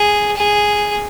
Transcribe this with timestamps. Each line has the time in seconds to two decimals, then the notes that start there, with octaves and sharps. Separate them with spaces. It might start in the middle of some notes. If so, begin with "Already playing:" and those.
Already playing: G#4
0.36 G#4